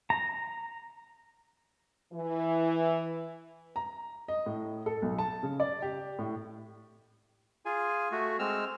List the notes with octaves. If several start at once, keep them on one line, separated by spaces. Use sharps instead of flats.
A#5
E3
A#5
D#5
A2
A4
B1
A5
C#3
D5
G4
A2
F4 G#4 G#5
A3 F#4
G#3 C4 E6 F6